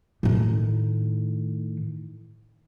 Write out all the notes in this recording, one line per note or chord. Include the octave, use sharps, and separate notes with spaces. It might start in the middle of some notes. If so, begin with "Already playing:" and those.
A2 D#3